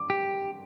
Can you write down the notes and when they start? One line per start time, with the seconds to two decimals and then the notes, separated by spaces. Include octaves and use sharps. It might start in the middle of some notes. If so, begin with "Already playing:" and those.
Already playing: D6
0.10 G4